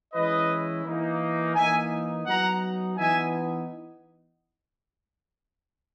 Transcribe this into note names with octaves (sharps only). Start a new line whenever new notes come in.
E3 G#3 C#4 E4 B4 D#5
E3 A#3 D#4
E3 A#3 D#4 E5 G#5
F#3 B3 D#4 F#5 A#5
E3 B3 D#4 E5 G#5